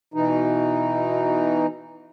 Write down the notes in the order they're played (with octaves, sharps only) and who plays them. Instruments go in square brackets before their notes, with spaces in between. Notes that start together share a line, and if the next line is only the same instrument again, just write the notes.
[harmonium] B2 E3 D#4